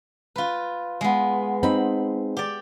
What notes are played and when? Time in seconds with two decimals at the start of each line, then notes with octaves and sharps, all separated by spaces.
0.36 F4 B4
1.01 G#3 B3
1.63 C4 D#4 B5
2.37 G4 D5